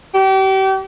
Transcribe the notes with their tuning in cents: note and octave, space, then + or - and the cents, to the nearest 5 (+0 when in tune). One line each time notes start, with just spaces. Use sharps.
G4 -35